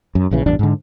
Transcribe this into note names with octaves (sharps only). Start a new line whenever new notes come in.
F#2
A#1 C#3 E3
A1 E2 G2 D4
G#2 D3